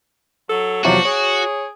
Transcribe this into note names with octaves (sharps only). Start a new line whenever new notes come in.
F#3 A4
E2 C3 F3 F#3 D4 F#4
G#4 C#5 D7